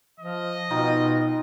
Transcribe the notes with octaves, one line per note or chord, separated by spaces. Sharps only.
F3 D#5
B2 D#4 F4 G5